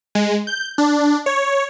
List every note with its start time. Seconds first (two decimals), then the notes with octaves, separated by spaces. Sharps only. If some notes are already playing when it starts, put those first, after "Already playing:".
0.15 G#3
0.47 G6
0.78 D4
1.26 C#5